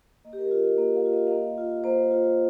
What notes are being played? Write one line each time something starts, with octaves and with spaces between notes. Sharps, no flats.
A#3 D#5
G4
A#4
F4 A#4
D#5
A#3 D#5
F5
F4
D#5
F5
A#3 D#5
F4
A#3 C5
F4